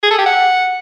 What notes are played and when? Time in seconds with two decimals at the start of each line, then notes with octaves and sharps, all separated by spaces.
0.03 G#4
0.11 A4
0.19 G4
0.26 F#5